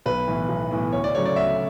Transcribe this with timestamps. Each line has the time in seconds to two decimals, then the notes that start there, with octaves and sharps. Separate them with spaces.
0.06 B1 B4
0.28 A2 E3 B3
0.49 B1
0.71 A2 E3 B3
0.92 D2 C#5
1.04 D5
1.14 C#3 F#3 A3 C#5
1.26 D5
1.36 D2 E5